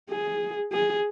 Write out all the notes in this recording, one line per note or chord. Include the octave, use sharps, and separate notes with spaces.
G#4
G#4